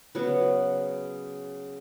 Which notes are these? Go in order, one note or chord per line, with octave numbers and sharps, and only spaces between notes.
C#3 F#3 B3 B4